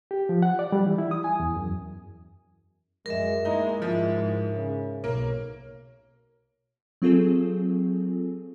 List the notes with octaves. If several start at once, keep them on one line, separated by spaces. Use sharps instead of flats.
G4
F3
F#5
D5
G3
E3
E4
D#6
G#5
E2
F#2
F#2 G#3 A#4 E5
G#3 A#3 D#4 E4
G#2 F3 G#3
C#3
B1 A#3 C#5
F#3 C4 F4 G#4 A4